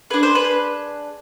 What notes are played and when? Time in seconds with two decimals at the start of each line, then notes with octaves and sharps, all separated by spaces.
0.10 D4 G#4 B4
0.23 C5
0.35 B4